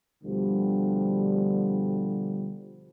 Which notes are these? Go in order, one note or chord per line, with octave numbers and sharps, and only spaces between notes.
D2 B2 D3 F3 G3